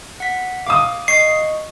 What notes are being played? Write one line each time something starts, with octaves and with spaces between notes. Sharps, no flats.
F#5 B6
F5 D6 D#6
D#5 C#6 C7